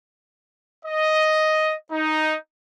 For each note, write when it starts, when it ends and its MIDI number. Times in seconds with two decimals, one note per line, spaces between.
0.84 1.75 75
1.91 2.36 63